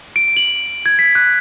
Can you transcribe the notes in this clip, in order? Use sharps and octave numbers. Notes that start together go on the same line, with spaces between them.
D7
F#7
G#6
B6
F#6